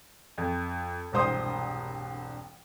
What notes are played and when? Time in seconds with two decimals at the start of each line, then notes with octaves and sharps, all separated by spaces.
0.38 F2
1.12 E1 C2 G2 C5 C6 D#6